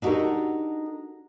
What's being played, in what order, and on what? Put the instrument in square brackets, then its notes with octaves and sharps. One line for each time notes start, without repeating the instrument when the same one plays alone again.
[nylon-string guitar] D4 D#4 F#4 G4 A4 A#4